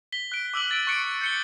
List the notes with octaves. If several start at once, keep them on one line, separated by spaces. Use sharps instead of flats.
B6 G7
F#6 D7
D6 E6 F#6 F#7
A6 D7
C#6 F#6 C#7 D7
G6 C#7 G7